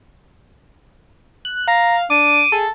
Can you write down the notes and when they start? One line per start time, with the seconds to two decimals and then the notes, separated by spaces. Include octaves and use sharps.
1.45 F#6
1.68 F5 A#5
2.10 D4 D6 D#7
2.52 G#4 A4